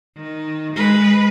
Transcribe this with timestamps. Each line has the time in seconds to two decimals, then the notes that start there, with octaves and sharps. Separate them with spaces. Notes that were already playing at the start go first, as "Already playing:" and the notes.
0.17 D#3
0.74 G#3 B4